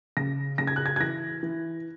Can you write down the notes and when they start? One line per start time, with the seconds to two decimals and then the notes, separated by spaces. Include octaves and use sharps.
0.17 C#3 A#6
0.58 C#3 A#6
0.67 G#6
0.76 F#6
0.86 G#6
0.96 G#6
1.00 E3 A#6
1.43 E3